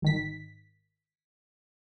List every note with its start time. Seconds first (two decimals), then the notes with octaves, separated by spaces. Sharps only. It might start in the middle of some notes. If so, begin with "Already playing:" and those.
0.02 G#1 D#3 B6